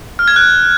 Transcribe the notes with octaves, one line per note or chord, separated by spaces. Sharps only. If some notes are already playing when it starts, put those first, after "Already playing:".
F6
G#6
F#6